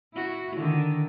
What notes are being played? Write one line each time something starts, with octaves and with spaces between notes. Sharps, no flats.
E4 F#4
D3 D#3